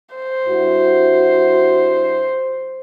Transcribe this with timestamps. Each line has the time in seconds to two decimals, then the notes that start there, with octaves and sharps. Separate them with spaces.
0.15 C5
0.47 G2 E4 F#4